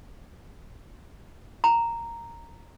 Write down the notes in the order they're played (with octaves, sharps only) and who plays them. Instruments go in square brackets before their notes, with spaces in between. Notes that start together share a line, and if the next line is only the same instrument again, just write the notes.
[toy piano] A#5